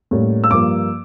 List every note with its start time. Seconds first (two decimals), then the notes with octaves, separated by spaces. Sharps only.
0.11 A2 G3 A#3 C#4
0.44 E6
0.50 G2 F3 A#3 D6